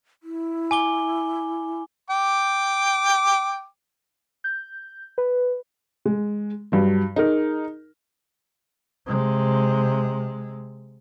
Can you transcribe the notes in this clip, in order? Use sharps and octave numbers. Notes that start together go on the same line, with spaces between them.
E4
G#5 D6 G7
G5 D6
G6
B4
G#3
G2 F#3
D#4 G#4 A#4
C3 G#3